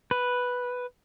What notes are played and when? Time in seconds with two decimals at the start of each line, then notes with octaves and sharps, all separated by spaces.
0.11 B4